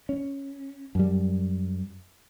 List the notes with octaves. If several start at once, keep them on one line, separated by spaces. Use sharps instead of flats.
C#4
F#2 G3